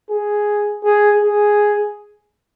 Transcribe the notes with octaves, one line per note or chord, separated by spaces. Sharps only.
G#4
G#4
G#4